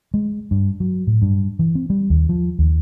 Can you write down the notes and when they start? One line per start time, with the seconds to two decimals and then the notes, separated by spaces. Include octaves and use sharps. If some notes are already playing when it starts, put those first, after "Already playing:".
0.14 G#3
0.51 G2
0.80 F#3
1.07 A2
1.22 G2
1.59 E3
1.75 C4
1.90 G3
2.10 D#2
2.29 F3
2.59 D#2